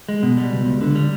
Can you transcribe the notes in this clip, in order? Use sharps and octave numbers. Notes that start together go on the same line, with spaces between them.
G#3
B2
G3
C#2
C#2
D3
G3